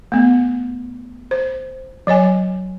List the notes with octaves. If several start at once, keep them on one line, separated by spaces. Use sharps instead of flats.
A3 B3
C5
F#3 C#5 D#5 G#5